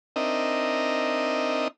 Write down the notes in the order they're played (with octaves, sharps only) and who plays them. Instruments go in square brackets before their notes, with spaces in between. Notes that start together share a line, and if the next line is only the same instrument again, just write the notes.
[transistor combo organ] C4 D4 D#4 A#4 D#5 E5